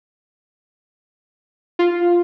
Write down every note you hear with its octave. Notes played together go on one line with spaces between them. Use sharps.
F4